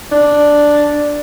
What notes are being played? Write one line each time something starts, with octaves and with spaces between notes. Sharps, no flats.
D4